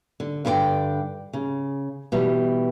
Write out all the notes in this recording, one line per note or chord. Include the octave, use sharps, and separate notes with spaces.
D3
G2 D3 E4 B4 D5 G5
C#3
B2 E3 G3